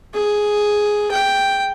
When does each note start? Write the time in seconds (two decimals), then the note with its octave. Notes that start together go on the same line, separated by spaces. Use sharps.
0.14 G#4
1.11 G5